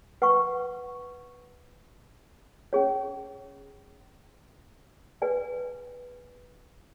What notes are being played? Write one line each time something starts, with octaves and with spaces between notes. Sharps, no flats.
B4 F#5 C#6
C#4 G#4 C#5
G#4 B4 D5 G#5